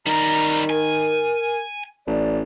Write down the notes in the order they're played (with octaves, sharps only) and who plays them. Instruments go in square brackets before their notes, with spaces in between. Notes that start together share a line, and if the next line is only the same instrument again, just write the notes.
[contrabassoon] D#3 [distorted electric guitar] G3 A#4 [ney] A#5
[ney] A#4 [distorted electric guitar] G#5
[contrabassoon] A1 [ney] D5